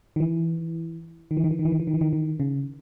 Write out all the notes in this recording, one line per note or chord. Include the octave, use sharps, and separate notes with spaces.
D#3
E3
D#3
E3
D#3
E3
D#3
E3
D#3
E3
D#3
E3
D#3
D#3
C#3